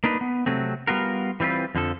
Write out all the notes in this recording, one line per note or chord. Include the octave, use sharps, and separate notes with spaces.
A#3 D4 D#4 B4
B3
C3 F#3 A3 C4
G3 B3 F4 F#4 A#4
E3 G3 C4 F4 B4
F2 D3 F3 A4